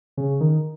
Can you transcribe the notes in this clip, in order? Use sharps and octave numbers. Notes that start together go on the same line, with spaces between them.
C#3
D#3